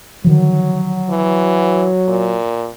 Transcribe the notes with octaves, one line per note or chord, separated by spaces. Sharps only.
D3 D#3 F3 F#3
E3
A#2